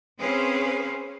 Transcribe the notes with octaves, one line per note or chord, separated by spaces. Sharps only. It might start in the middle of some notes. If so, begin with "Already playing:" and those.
C4 C#4 G#4 B4 C5 F5